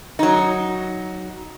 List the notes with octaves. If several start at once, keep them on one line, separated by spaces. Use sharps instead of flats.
F#3 D#4